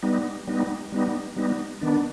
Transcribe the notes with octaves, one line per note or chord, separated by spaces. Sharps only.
G3 B3 D#4
G3 B3 D#4
G3 B3 D#4
G3 B3 D#4
D#3 B3 D4